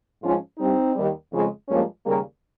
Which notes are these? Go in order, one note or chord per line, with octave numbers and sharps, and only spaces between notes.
G#2 F3 G#3 C#4 F4
G2 G3 C4 D#4
D#2 D#3 G3
F2 C#3 F3 G#3
G2 F3 G#3 A#3 C#4
D#2 C#3 G3 A#3